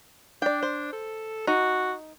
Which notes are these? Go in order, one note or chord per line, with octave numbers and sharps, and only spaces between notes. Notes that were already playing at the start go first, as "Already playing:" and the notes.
D4 D5 G5
C5
A4
D#4 F#4